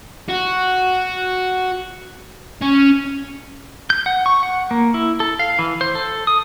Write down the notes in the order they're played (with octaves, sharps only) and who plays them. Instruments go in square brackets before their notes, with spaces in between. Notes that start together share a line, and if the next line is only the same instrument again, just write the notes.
[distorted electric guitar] F#4
C#4
[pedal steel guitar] G6
F#5
C#6
F#5
A#3
E4
A4
F5
E3
C5
A4
D#6